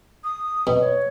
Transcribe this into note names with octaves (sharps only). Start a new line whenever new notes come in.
D#6
B2
C#5